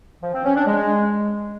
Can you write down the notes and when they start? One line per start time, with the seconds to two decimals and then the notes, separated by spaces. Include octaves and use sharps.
0.22 F3
0.33 C4
0.45 C#4
0.56 D4
0.67 G#3